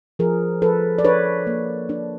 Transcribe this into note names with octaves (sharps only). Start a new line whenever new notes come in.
F3 G#4 A#4
F3 A4 B4
D5
D4 B4 C#5
A#3
D4